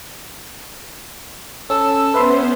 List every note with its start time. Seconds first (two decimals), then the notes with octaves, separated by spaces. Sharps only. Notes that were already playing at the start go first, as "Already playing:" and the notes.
1.70 C#4 A4 E6
2.14 B3 C#4 B4 C5 E5 C6